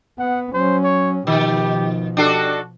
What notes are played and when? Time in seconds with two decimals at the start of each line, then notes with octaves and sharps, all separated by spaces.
0.19 B3 F#5
0.54 F#3 C#4 C5
0.84 C#5
1.27 B2 D#3 F3 G4
2.17 D4 F#4 G4 A4